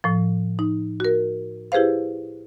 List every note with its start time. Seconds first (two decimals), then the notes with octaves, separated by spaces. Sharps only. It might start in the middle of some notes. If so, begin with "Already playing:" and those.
0.04 A2 F3
0.59 D#4
1.00 F#4 A#4
1.72 E4 G4 G#4 B4 C5 F5